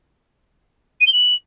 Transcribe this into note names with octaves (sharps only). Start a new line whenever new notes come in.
D#7
G7
F#7